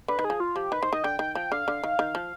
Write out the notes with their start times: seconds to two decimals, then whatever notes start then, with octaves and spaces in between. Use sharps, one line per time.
0.08 D3 B4
0.19 D#3
0.24 G#4
0.30 F3
0.40 F4
0.56 F3 G4
0.72 D#3 B4
0.82 D#3 C5
0.93 D#3 D#5
1.04 D3 G5
1.19 D#3 G5
1.35 F3 G5
1.52 D3 F5
1.68 D3
1.84 D#3
1.99 D#3
2.15 F3